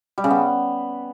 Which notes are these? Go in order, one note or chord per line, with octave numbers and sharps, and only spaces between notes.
G3
C#3
B3